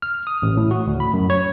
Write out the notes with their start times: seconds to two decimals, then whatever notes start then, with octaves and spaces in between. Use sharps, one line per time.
0.02 F6
0.27 D#6
0.42 A1
0.57 A2
0.71 F#4
0.87 D2
1.00 B5
1.13 F#2
1.30 C#5